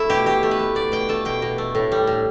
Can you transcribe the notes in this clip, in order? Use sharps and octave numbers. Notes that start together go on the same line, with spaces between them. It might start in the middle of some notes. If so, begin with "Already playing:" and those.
Already playing: A3 E4
B2 G4
B2 G4
A3
B4
A3
B2 D5
B2 G5
A3 A5
B2 G5
B2
A3
A2
G3
A2